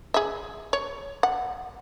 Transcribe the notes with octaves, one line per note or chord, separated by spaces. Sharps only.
G#4 E5
C#5
F#5